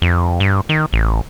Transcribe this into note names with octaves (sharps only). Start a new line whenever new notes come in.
F2
G2
D#3
A1